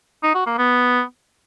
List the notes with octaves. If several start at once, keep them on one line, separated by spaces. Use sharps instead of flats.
D#4
F#4
A#3
B3